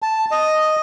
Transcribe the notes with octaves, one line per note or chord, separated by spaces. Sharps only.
A5
D#5